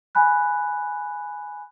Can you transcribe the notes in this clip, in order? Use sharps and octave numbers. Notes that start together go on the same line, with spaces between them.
G#5 B5 F#6